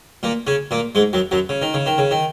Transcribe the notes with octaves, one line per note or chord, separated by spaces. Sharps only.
A#2 A#3
C#3 C#4
A#2 A#3
G#2 G#3
F#2 F#3
F#2 F#3
C#3
D#3
C#3
D#3
C#3
D#3